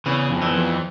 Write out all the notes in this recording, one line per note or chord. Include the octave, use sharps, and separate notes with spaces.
E2 C#3 E3
F2
E2 E3
F2